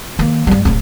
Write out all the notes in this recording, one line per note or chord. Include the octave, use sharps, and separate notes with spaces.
D#3 A#3
G2 G3
D1 D2